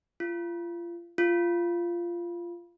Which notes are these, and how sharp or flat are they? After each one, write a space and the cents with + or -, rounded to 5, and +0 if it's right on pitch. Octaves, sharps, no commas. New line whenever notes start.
F4 -30
F4 -15